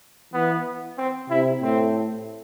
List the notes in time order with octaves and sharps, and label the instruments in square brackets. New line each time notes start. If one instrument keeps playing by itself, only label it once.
[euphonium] E3 [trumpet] B3
[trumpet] C4
[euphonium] C3 [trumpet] E4
[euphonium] A2 [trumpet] C4